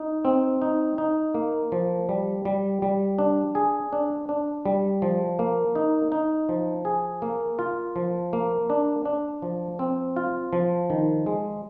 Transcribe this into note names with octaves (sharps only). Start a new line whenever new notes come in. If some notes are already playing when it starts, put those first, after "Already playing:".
Already playing: D#4
C4
D#4
D#4
A#3
F3
G3
G3
G3
D4
G#4
D4
D4
G3
F3
A#3
D#4
D#4
F3
G#4
A#3
F4
F3
A#3
D4
D4
F3
C4
F4
F3
D#3
G#3